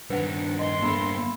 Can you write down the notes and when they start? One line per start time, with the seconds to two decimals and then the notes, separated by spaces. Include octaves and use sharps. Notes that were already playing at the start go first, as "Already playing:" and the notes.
0.10 G2 D#3 D4 B4 F#5
0.59 D#5 C6
0.82 G2 A#3 B3 B5